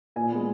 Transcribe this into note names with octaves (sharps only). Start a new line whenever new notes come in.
A#2 G#5
G#3 B3